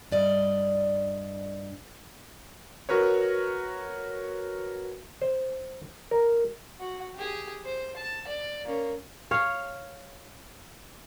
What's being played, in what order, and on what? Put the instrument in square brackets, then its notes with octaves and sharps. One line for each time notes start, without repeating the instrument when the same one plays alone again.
[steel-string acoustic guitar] G2 D5 D#5
[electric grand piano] F#4 A#4 B4 C#5
[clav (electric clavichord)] C5
A#4
[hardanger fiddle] F#4
G4 G#4
C5
A5
D5
A#3 C#4
[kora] C#5 F5